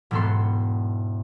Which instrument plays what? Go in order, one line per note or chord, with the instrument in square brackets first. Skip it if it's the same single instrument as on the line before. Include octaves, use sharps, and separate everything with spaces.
[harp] E1 G#2 B3 A4 C6